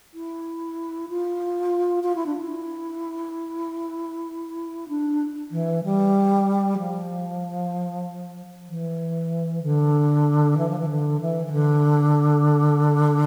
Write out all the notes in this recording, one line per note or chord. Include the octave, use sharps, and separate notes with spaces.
E4
F4
F4
E4
D4
E4
D4
E3
G3
F3
E3
D3
E3
F3
E3
D3
E3
E3
D3